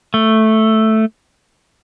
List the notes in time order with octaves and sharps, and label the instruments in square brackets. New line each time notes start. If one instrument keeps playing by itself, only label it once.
[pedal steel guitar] A3